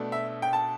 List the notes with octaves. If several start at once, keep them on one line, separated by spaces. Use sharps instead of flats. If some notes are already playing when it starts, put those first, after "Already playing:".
Already playing: B2 A3 D4
E5
G5
A5